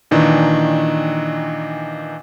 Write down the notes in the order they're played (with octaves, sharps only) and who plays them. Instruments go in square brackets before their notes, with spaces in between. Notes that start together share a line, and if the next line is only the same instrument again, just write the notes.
[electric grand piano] A#2 D#3 E3 D4